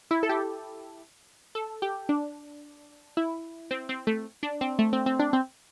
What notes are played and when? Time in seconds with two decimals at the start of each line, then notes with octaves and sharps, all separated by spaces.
0.11 E4
0.23 A4
0.29 G4
1.55 A4
1.82 G4
2.09 D4
3.17 E4
3.71 C4
3.89 C4
4.07 A3
4.43 D4
4.61 C4
4.79 A3
4.93 C4
5.06 C4
5.19 D4
5.33 C4